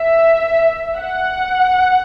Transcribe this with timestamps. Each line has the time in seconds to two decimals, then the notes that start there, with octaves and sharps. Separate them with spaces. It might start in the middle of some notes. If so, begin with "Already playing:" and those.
Already playing: E5
0.97 F#5